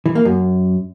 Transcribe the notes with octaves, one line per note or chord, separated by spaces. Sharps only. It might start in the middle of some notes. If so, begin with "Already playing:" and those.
E3
A#3
F#2